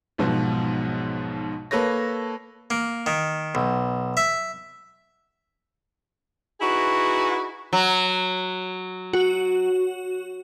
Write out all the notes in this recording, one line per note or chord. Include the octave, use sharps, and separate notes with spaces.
B1 G#2 B2 F3
A#3 A4 B4 C#5 A#6
A#3
D#3
B1
E5
D#4 E4 F#4 G#4 B4
F#3
F#4